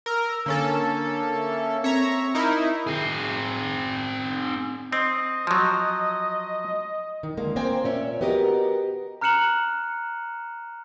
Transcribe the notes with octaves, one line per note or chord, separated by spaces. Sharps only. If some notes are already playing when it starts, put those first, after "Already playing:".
A#4 E6
D3 A#3 C#4 A4
E5
C4 C#5 E5 A#5
D#4 E4 A#4
C4 G#4
C4 D#5
F3 F#3
D#3
D3 G#3 A#3
A#3 C4 A#4 C5 G5 G#5
A#2 C#4 E5
B3 F#4 G4 A#4 D#5
A#5 F6 F#6 C#7 E7 F#7